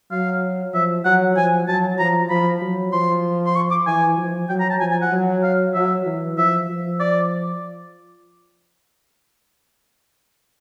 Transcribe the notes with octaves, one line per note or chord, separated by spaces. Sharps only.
F#3 F5
F3 E5
F#3 F#5
F3 G#5
F#3 A5
F3 A#5
F3 B5
F#3
F3 C6
C6
C#6
D6
E3 G#5
F3
F#3 G5
A#5
A5
F3 G#5
G#5
F#5
F#3
F5
F#3 E5
E3
F3 E5
F3
D5